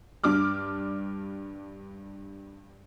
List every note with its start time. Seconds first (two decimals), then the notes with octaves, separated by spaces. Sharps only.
0.24 G2 D4 D6 F6